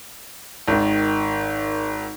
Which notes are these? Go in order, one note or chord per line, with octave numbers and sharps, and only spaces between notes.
G#1 D#3